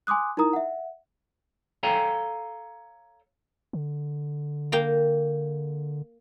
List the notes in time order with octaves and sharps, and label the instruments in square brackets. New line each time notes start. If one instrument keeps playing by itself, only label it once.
[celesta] G#5 C6 D6 D#6 F#6
D#4 E4 A#4 A#5 D#6
E5 F#5
[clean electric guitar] A4 C#5 F5 G5 G#5 A#5
[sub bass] D3
[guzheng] A#3 G5 A#5